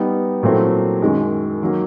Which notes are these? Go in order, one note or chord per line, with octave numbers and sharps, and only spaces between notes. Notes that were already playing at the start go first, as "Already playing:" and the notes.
Already playing: G3 B3 D#4
A#2 F#3 A3 C4 E4
F#2 D#3 G#3
D#3 F#3 A#3